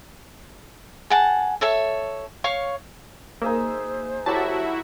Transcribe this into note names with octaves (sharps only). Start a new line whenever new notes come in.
G#4 F#5 A5
A4 C#5 E5
C#5 F5 C#6
A#3 D#4 G#4 C5 E5
F#3 E4 F#4 G4 A4 E5 A5